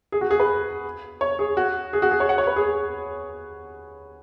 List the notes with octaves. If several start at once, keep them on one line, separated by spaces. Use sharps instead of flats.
G#4
F#4
G#4
B4
C#5
G#4
F#4
G#4
F#4
G#4
C#5
F#5
C#5
B4
G#4